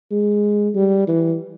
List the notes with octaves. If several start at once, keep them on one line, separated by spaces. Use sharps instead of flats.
G#3
G3
E3